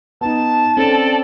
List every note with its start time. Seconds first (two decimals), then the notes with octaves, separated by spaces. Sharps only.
0.21 B3 D#4 A5
0.77 C4 C#4 A4 D5